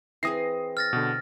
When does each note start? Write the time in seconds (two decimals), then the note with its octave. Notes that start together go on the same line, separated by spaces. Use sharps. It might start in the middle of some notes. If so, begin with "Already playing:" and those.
0.23 E3 C4 G#4 D#6 A#6 C7
0.77 F6 A6 A#6
0.93 B2 D3